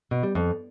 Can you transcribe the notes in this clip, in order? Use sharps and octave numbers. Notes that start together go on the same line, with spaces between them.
B2
G3
F2